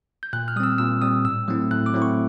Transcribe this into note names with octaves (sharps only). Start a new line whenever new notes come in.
G6
A#2 F#6
F6
G3 C4 D#6 E6
A#2 E6
G3 C4 D#6
A2 E6
F#3 A3 C4 E4
A2 F#6
D6
F#3 A3 C4 E4
C#6